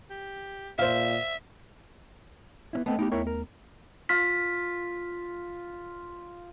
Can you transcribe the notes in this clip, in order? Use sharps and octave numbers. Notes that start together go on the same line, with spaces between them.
G4
A#2 C5 E5 F5
B3 C#4 E4
A3 B3 C4 A4 D#5 G5
B3 D#4 F4 G4
D#2 E4 A#4 C#5
A#4
F4 B6